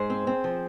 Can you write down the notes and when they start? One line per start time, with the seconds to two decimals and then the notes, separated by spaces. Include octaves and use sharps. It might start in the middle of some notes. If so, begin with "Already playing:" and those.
Already playing: G#2 G#4 C5
0.10 C4
0.27 C4
0.44 F3